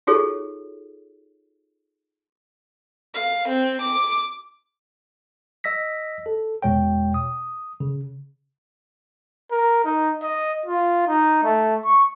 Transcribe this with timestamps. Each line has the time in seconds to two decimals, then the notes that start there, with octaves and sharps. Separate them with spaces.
0.07 D#4 F4 F#4 G#4 A4 C#5
3.14 F5
3.48 C4
3.82 D6
5.64 D#5 E6 A#6 B6
6.26 A4
6.62 E2 B2 G#3 C#5 G5
7.14 D#6
7.80 C#3
9.51 A#4
9.85 D#4
10.22 D#5
10.66 F4
11.08 D#4
11.44 A3
11.85 C#6